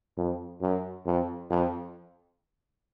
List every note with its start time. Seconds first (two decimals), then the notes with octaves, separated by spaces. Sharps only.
0.18 F2
0.62 F#2
1.06 F2
1.51 F2